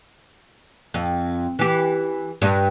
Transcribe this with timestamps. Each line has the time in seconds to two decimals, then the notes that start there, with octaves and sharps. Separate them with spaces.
0.94 F2
1.59 E3 G4
2.42 G2